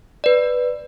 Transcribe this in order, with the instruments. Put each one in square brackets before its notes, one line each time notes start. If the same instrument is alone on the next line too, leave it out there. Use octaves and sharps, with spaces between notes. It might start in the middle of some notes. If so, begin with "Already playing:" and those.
[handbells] B4 D5